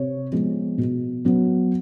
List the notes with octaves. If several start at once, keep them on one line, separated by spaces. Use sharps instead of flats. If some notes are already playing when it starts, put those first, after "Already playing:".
Already playing: C3 C#5
F3 G#3 B3
B2
F#3 B3